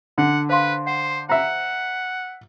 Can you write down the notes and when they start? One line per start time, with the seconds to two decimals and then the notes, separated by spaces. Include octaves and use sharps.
0.18 D3 F#5
0.49 B4 C5 F5 C6
0.87 C5 F#5
1.29 C5 E5 F#5 A#5